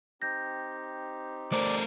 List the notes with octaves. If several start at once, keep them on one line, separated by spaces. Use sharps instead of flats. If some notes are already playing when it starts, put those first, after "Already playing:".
C4 D#4 G4 G6 A#6
A3 A#4 C5 D5